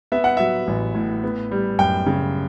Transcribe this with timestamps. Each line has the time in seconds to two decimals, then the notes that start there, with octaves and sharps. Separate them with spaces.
0.12 B3 E5
0.24 F#5
0.37 F#3 E5
0.67 A1
0.95 A2
1.24 B3
1.51 G3
1.78 F#2 G5
2.06 C#3